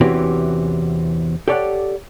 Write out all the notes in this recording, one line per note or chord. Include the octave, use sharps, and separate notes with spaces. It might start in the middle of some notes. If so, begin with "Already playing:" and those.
E2 C3 E3 C#4 F#4 G4
G4 A4 C#5 D5 F5 F#5